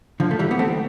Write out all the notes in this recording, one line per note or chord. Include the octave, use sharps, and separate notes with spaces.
D3 F3
A3
E3 G3
B3
A3 C4